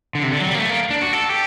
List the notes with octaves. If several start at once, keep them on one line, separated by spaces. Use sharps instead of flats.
D3
C3
D3
F#3
G3
A#3
A3
A#3
D4
F#4
A4
G4